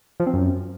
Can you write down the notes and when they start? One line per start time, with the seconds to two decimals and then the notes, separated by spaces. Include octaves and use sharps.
0.20 F3
0.27 C4
0.33 F#2